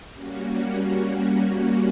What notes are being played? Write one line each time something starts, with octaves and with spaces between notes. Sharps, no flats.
G3 A#3 C#4 F#4